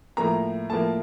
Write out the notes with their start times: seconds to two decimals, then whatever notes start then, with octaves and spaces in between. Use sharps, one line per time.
0.17 A2 F3 A#3 A#5
0.70 A2 F3 A#3 A5